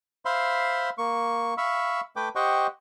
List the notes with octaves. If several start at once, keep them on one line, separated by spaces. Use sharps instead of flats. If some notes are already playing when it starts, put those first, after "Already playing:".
C5 E5 F5 B5 C6
A#3 C#6
E5 F5 B5 C#6 E6
A3 B4 G5 D6
G4 C5 D#5 F#5 G5 C#6